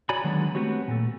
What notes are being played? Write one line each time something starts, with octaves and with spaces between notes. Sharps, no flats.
F#4 C#5 D5 G#5 A#5 B5
D3 D#3 F#3 G#3 B3
A3 B3 C4 F#4 G4 C#5
A#2 A3